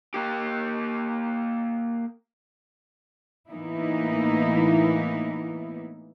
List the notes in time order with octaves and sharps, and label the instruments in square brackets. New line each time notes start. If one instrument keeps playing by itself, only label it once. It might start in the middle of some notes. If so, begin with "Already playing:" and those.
[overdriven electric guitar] A#3 G4
[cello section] A2 E3 A#3 B3 D#4 E4